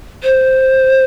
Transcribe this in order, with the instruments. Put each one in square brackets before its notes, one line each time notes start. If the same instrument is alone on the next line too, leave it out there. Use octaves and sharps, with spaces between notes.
[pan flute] C5